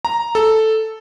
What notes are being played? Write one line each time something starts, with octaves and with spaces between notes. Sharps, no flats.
A#5
A4